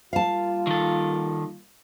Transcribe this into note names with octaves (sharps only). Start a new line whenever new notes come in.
G3 A#3 F4 F5 A5
D#3 A4